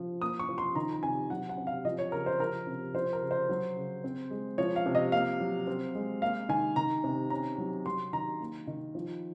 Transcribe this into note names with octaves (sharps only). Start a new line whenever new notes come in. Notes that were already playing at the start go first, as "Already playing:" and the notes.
Already playing: F3
A#3 D#6
C#6
F3
C6
D#3 A#5
A#5
C3 G#5
F#3 F#5
F#5
C3
F5
F3 D#5
C#5
C#3 A#4
C5
F3 A#4
C3
F3 C5
A#4
C#3
C5
F#3
C#3
C4
G#3
F3 C#5
F5
C3
D#5
A#3 F5
F#3
C4
G#3
A#3 F5
D#3 G#5
D#3 A#5
C3
C#4 A#5
F#3
F#3 C6
D#3 A#5
A#3
D#3
F3